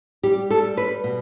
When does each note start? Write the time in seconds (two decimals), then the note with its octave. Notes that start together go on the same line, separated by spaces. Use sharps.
0.23 G3 G4
0.50 G3 A4
0.77 G3 B4
1.04 B2